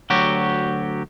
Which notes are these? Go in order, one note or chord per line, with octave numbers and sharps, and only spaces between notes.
D2 F#3 F#4 G4